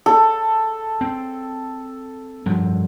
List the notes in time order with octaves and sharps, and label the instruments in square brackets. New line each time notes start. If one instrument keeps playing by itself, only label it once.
[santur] A4
[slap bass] C4
G2 F3 F#3